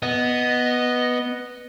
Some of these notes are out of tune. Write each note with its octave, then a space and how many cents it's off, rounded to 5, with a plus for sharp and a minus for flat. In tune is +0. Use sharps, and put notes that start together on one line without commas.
B3 +0 D#5 +0